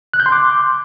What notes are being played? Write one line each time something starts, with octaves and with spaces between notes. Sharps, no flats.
F#6
G6
C6
D6